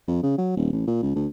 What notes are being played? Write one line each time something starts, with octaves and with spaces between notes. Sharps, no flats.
F2
C#3
F#3
D#1
A1
A#2
C#2
D2